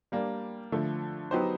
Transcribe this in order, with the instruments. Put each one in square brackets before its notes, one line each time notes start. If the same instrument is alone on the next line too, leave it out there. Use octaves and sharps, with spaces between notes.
[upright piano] G3 A#3 D4
D3 F3 A3
F#3 B3 D#4 G4 C5